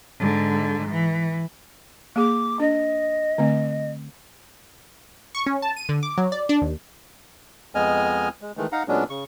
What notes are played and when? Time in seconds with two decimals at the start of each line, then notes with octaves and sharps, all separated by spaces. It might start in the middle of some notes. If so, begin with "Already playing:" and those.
0.19 G#2 D3
0.89 E3
2.16 A#3 G#4 D6
2.60 D4 D#5
3.38 D3 A3 C4
5.35 C#6
5.46 C#4
5.62 A5
5.77 D#7
5.89 D3
6.03 D6
6.18 F#3
6.32 D5
6.49 D4
6.62 D#2
7.75 F2 G#3 B3 D#5 G#5 F6
8.41 G#3
8.57 D#3 E3 G#3 A3
8.72 D#4 F5 F#5 A#5
8.88 A#2 F#3 G#3 B3 C#4 D4
9.10 C#3 C#6